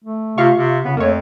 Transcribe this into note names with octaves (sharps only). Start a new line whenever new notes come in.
A3
C3 F4 F5 C#6
C3
C#3 B3
F2 A3 A#3 C#5